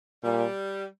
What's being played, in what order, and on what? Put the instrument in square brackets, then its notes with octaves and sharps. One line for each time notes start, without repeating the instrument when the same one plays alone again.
[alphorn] A#2 [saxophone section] G3